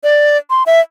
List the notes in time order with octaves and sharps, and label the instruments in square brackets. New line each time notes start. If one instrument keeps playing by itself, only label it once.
[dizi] D5
C6
E5